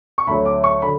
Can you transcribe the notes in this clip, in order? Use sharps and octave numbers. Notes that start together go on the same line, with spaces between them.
C#6
D2 D3 F#3 B5
D6
C#6
D3 B5